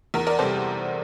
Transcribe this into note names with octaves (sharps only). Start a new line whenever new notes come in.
E2 A#4
A#4 D5
C3 G3 A4 C5